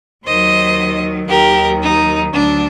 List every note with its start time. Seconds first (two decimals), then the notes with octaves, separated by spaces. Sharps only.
0.25 D#2 D#3 F#3 C5 D#5
1.28 D#2 D#3 F#3 G4 A#4
1.81 D#4
2.33 D2 D3 F#3 D4